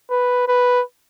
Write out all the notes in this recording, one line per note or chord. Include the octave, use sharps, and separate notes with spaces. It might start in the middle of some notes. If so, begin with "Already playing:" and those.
B4
B4